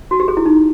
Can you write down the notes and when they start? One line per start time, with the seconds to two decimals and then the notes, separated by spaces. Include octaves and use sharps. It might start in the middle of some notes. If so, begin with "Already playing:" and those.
0.11 F#4
0.20 G4
0.28 G#4
0.37 E4
0.46 D#4